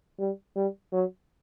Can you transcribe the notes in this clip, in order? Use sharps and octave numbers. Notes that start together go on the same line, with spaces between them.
G3
G3
F#3